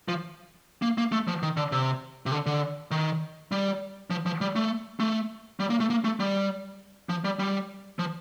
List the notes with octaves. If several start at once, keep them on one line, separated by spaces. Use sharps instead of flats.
F3
A#3
A#3
A3
F3
D#3
D3
C3
C3
D3
D3
D#3
G3
F3
F3
G3
A3
A3
G3
A#3
A3
A#3
A3
G3
F3
G3
G3
F3